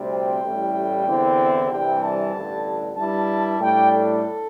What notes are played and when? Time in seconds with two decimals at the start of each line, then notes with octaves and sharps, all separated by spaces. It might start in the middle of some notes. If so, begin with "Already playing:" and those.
Already playing: D2 C3 G3 C4
0.11 G5
0.43 A1 A2 G3
1.06 E2 D3 C4 E4
1.70 C2 C3 E3 G3 D4 G5
2.02 A5
2.34 A1 G2 D3
2.97 G2 G3 E4 A5
3.61 A2 G3 D4 G5
3.92 A4